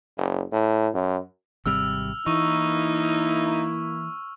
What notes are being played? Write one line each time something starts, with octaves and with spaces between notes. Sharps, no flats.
F#1
A2
F#2
G#1 C3 G3 E6 F6 F7
E3 A#3 D#4 E4 C#6